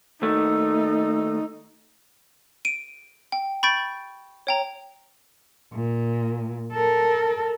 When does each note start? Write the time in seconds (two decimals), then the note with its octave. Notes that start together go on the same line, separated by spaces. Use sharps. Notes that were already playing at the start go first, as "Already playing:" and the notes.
0.22 D#2 A3 D#4
2.65 D7 D#7
3.32 G5
3.63 B5 C#6 G6 A6 D7
4.47 C#5 G5 A#5
5.73 A#2
6.73 A4 A#4